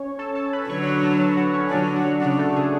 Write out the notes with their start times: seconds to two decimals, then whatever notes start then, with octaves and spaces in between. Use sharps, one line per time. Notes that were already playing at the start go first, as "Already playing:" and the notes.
Already playing: C#4 C#5
0.19 A4 A5
0.35 A4 A5
0.53 B4 B5
0.69 D3 F#3 C#5 C#6
0.86 B4 B5
1.03 A4 A5
1.20 A4 A5
1.37 F#4 F#5
1.53 C#4 C#5
1.70 D3 F#3 D4 D5
1.96 F#4 F#5
2.21 C#3 D4 D5
2.39 A3 A4
2.56 G#4